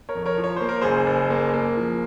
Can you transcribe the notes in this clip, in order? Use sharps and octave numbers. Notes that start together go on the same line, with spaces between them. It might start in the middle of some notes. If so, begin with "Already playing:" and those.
A#4 C#5
F2
A#4 C#5
F3
C#5
A#3 C5
A#4
F#1 G#4 C5
F#1
A#3
A#3
F3